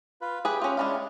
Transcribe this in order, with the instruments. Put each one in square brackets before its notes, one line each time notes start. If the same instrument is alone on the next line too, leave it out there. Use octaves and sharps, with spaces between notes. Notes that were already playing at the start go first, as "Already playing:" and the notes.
[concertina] F4 B4
[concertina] G4 [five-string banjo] G#4 B4
[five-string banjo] C#4 F4
[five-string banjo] G#3 C#4 F5 [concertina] D4 E4